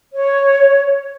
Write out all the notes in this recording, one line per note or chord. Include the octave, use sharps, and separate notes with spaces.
C#5